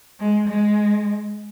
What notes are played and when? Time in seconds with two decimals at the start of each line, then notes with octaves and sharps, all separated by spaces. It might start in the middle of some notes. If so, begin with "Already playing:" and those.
0.20 G#3
0.48 G#3